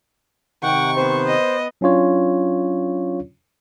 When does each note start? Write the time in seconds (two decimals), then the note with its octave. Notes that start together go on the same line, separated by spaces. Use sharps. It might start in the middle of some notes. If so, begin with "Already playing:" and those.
0.63 C3 D#3 F#5 G5 C#6
0.97 B3 C5
1.27 D#5
1.81 F#3 C#4 D4 F4 C#5